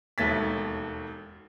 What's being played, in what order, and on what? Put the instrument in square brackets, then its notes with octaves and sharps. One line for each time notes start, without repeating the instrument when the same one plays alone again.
[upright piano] E1 D#2 A3 A6 B6